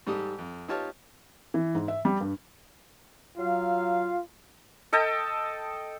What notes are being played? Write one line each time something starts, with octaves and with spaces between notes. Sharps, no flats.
G#2 G3 G4 A4 D#6
F2
D#4 F4 G4 C#5 A5 F6
E3
G#2
E5
G3
G2
F#3 F4 F5
A4 D#5 G5 A5